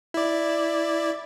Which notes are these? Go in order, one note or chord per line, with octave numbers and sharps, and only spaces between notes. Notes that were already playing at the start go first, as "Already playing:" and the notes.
E4 D5